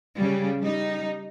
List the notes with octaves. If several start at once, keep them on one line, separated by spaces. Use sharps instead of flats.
C#3 G3
G3 D#4